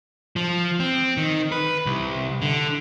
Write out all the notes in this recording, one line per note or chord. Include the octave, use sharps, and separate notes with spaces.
F3
C4
D#3
B4
C2
D3